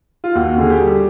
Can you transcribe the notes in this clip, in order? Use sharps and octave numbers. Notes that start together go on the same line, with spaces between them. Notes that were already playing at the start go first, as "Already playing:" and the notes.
F4
D#2 F#4
D3 G#4
G4
G3